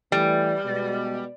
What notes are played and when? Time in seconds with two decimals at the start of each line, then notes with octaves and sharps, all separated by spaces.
0.12 E3 G3 A3
0.65 B2 G#3